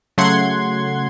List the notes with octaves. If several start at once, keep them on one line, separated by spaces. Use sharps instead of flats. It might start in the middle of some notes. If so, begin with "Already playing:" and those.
C#3 F#3 A3 F#5 C6 G#6